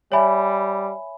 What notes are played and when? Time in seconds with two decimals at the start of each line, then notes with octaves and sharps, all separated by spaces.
0.12 G3 C#5 E5 G#5 B5